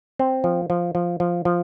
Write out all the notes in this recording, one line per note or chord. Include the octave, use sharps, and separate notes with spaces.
C4
F3
F3
F3
F3
F3